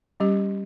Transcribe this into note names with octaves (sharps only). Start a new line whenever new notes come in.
G3 C#4 G4